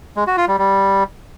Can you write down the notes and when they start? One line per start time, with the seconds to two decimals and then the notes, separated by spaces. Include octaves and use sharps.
0.17 G#3
0.27 F#4
0.37 F4
0.48 G3
0.58 G3